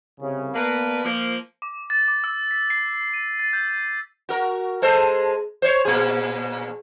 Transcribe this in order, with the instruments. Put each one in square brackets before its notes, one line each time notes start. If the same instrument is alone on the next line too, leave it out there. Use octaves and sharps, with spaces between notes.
[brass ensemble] C2 C#3
[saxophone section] A#3 B4 [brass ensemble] B3 D5 A5
[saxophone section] F3 A#3
[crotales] D6
A6
D6
E6
B6
C7
D#7
A6
G6
[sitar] F#4 A#4
G#3 A4 C5
C5 C#5
A#2 G#4